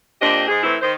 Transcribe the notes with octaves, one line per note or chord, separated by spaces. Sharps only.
A#2 C4 D4 G4 D#5
G#2 G#4
A2 E3 C4 E4
D#3 C5